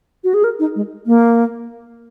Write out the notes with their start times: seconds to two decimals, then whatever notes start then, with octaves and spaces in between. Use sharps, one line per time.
0.24 F#4
0.34 G#4
0.44 A#4
0.59 D#4
0.76 G#3
1.06 A#3